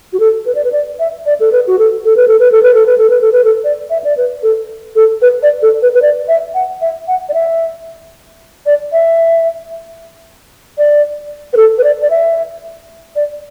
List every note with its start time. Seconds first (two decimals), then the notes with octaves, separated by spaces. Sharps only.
0.13 F#4
0.20 A4
0.46 B4
0.55 D5
0.64 B4
0.72 D5
0.99 E5
1.26 D5
1.40 A4
1.52 B4
1.67 F#4
1.79 A4
2.05 A4
2.16 B4
2.28 A4
2.39 B4
2.52 A4
2.63 B4
2.74 A4
2.86 B4
2.98 A4
3.10 B4
3.21 A4
3.32 B4
3.44 A4
3.64 D5
3.90 E5
4.04 D5
4.17 B4
4.43 A4
4.96 A4
5.22 B4
5.43 D5
5.62 A4
5.82 B4
5.94 B4
6.02 D5
6.28 E5
6.54 F#5
6.81 E5
7.08 F#5
7.29 D5
7.34 E5
8.66 D5
8.92 E5
10.78 D5
11.53 B4
11.56 A4
11.78 B4
11.84 D5
12.02 D5
12.10 E5
13.16 D5